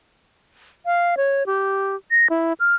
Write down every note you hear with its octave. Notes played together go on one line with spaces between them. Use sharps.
F5
C#5
G4
A#6
E4
F6